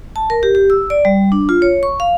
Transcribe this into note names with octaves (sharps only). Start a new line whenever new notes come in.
A5
A#4
G4
G4
E6
D5
G3
D4
F4
C#5
C#6
F5